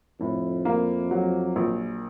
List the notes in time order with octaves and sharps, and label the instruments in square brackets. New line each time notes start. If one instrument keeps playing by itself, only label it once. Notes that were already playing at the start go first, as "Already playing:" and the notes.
[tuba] F2 [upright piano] A2
[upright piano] A#3
F#3
A#1